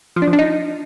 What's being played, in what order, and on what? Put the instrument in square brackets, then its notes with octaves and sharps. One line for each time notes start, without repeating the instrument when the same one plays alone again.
[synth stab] F3
D4
F3
D4
D#4